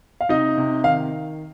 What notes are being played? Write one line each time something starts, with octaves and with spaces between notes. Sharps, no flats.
F5
C3 D#4 D#5
C3
D#3 F5